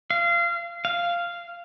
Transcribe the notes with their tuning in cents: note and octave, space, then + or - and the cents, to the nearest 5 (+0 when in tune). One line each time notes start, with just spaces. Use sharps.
F5 -25
F5 -10